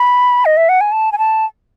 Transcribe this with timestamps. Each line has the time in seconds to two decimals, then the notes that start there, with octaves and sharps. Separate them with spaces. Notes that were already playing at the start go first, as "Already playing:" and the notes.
Already playing: B5
0.45 D#5
0.57 E5
0.69 F#5
0.81 G#5
0.92 A5
1.12 G#5
1.18 A5